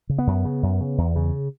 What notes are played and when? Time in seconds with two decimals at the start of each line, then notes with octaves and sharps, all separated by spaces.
0.09 C#3
0.18 B3
0.27 F#2
0.45 C#3
0.63 F#2
0.81 C#3
0.98 E2
1.16 C#3